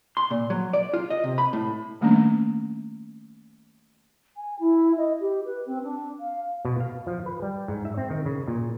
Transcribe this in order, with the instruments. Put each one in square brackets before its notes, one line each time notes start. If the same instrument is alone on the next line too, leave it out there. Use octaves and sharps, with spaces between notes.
[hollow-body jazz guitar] C6
A#2
F#3
D5
F4
D#5
C3
B5
A2
[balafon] D#3 G3 A3 A#3 C#4 D4
[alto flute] G#5
E4
D#5
G4
B4
C4
D4
F5
[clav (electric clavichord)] B2
F5
F3
B4
G3
G#2
E5
C4
D#3
C#3
A#2